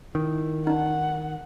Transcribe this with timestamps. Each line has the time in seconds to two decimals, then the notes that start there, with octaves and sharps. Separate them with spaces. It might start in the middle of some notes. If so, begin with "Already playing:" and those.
0.15 D#3 E4
0.67 D4 D#4 F#5